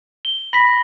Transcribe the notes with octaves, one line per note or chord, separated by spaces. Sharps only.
G7
B5 A#6 B6